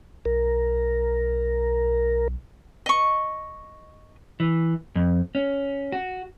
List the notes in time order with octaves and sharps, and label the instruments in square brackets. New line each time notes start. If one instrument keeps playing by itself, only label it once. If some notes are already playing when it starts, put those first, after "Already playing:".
[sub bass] B1 [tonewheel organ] A#4
[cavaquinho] D#5 C#6
[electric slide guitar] E3
F2
C#4
F#4